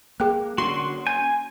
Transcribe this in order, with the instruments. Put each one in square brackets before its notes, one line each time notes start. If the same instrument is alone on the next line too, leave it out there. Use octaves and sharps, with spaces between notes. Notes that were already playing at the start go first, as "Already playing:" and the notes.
[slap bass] A#3 [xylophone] G#4 G5 F#6
[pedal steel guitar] D3 F#4 [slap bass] A#3 C#4 [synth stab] C6
[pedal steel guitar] G#5 [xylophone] G6